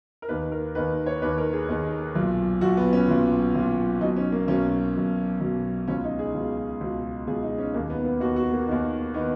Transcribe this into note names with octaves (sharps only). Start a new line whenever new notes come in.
A#4
D#2 D#3 B4
A#4
D#2 D#3 B4
C#5
D#2 D#3 B4
A#4
G#4
D#2 D#3
B1 A#2
B1 A#2 F#4
B3
C#4
B1 A#2
B1 A#2
B1 B2 D#4
C#4
A#3
B1 B2 C#4
B1 B2
B1 B2
C#2 B2 C#4
D#4
G#4
C#2 B2
C#2 B2
C#2 B2 G#4
D#4
C#4
D#2 D#3 A#3
B3
B3
D#2 D#3 F#4
F#4
A#3
D#2 D#3
D#3 B3